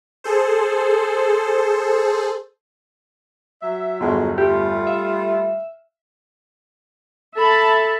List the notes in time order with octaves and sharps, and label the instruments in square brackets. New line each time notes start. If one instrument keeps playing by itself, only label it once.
[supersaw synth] G#4 A4 C5
[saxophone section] F#3 E5
[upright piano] G1 E2 [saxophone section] F#3 G#3 F4
[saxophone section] G3 A3 F4 [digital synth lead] G4
[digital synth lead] E5 [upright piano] F5
[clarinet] A4 [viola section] E5 A5 B5